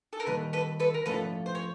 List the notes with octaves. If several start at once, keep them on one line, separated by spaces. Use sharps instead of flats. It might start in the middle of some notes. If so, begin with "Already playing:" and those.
A4
A#4
D#3 G3 A#3 A4 B4
A4 B4
A4 B4
A#4
F3 A3 C#4 F4 A4 B4
C5
C#5